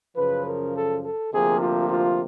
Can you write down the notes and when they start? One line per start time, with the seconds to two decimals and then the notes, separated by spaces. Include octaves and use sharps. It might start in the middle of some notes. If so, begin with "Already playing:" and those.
0.16 F#2 C#3 F3 B4
0.45 A#4
0.75 A4
1.03 A4
1.32 D2 C3 F3 A#3 G#4
1.61 F4
1.90 F4